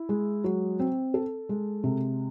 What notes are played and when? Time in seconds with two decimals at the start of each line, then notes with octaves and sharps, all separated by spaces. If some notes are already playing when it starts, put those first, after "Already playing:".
Already playing: E4
0.09 G#3
0.44 F#3
0.80 C4
1.14 A4
1.49 G#3
1.84 C3